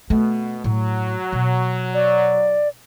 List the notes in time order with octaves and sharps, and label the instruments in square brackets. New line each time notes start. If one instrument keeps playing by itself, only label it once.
[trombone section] B2 [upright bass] A3
[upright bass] A2 [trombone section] F#3
[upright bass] B2
[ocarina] D5